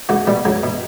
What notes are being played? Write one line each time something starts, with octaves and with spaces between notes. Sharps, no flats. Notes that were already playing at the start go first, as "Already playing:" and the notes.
C#2 F#4
B2 G3
C#2 F#3
B2